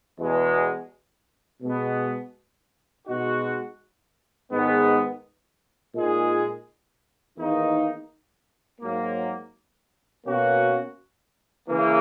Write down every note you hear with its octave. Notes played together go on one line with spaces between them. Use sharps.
E2 B2 G#3
B2 G#3 B3
B2 G#3 D#4 F#4
G#2 D#3 G#3 B3
A#2 G#3 D#4 G#4
E2 D#3 A#3 D#4
G#2 F#3 A#3
B2 A#3 C#4 F#4
C#3 E3 A#3